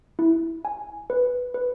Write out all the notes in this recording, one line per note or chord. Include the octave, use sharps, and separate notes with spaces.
E4
G#5
B4
B4